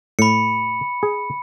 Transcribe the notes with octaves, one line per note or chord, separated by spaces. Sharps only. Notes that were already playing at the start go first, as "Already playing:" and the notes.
A2 B5 C#7
G#4